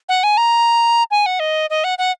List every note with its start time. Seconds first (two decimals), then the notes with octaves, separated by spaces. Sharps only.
0.09 F#5
0.23 G#5
0.37 A#5
1.11 G#5
1.26 F#5
1.40 D#5
1.70 D#5
1.84 F#5
1.98 F#5